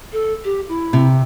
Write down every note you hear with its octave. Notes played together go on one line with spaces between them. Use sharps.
A4
G4
E4
C3